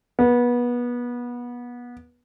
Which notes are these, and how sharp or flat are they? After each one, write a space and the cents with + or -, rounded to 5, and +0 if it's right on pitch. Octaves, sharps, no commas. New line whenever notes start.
B3 -25